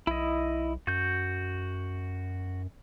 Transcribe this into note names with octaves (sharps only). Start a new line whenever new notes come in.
B1 E4 D#5
F#2 F#4 G6